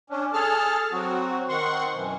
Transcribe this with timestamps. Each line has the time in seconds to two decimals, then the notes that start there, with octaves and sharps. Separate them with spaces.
0.10 C#4 D4
0.33 G#4 A4 A5 F6
0.92 F#3 C4 F#4
1.48 D#3 C4 F#5 C6 C#6
1.93 F#2 B2 E3